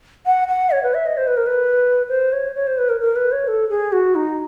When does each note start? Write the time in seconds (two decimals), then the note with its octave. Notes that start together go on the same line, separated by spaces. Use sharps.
0.26 F#5
0.48 F#5
0.71 C#5
0.83 B4
0.94 E5
1.06 D#5
1.17 C5
1.27 B4
1.37 A#4
1.47 B4
2.09 C5
2.33 C#5
2.55 C#5
2.67 C5
2.78 B4
2.89 A#4
3.01 A#4
3.16 B4
3.32 C#5
3.47 A4
3.69 G#4
3.92 F#4
4.15 D#4